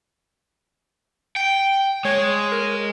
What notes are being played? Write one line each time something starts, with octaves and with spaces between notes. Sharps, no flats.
G5
G#3 C#5
A#4